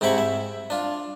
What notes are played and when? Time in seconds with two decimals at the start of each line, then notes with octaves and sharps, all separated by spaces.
0.01 G#2 C3 E4 G5 B5 C#6
0.18 E5
0.70 D4 F4